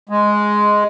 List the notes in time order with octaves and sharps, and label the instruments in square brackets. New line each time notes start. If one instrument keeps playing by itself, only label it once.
[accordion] G#3